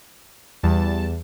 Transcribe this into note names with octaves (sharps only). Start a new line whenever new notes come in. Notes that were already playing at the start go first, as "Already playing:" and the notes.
E2 G3 A5